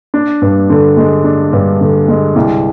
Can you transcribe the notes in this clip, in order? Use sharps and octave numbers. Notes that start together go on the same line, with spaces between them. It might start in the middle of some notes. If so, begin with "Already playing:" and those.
D4
G2
D3
G#3
D4
G2
D3
G#3
C2